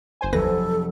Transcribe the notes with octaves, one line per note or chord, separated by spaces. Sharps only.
G1 C5 G#5
F1 D#2 F#3 A4 B4 A#6